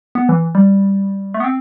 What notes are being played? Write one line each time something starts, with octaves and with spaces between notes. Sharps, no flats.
B3
E3
G3
A3
B3
C4